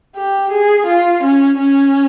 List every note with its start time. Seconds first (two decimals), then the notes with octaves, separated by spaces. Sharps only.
0.16 G4
0.52 G#4
0.87 F4
1.23 C#4
1.58 C#4